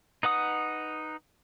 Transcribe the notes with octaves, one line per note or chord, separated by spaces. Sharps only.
D#4 B4 F#5 D#6